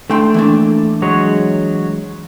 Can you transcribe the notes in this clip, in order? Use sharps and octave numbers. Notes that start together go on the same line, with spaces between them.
D3 A3 G5 C6
E3 A#3 D4
F#3 G#3 C#5